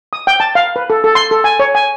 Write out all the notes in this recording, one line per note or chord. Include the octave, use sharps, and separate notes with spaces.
D#6
G5
A5
F5
B4
A4
A4
C6
A4
G#5
C#5
G#5